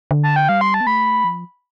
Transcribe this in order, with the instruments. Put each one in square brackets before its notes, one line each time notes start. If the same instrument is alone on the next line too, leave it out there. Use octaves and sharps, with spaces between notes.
[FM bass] D3
[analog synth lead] A5
G5
[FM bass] G3 [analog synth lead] F5
[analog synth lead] C6
A5
[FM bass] B3
[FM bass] A3 [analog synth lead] B5
[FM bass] F3